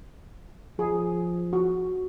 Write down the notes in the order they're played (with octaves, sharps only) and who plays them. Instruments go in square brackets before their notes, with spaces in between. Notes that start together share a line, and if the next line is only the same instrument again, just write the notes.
[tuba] F3 [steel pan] G#4
[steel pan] F#4